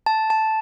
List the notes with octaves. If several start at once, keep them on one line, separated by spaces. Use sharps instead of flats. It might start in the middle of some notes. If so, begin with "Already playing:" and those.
A5
A5